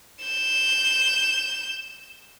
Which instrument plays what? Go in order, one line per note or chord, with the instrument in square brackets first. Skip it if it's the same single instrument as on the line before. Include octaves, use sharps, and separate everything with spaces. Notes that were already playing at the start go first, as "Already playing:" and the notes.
[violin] G6 E7